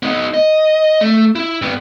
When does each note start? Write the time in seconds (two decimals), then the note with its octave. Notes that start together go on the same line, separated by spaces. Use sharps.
0.03 B3 D#4
0.34 D#5
1.01 A3
1.36 E4
1.62 G2 B3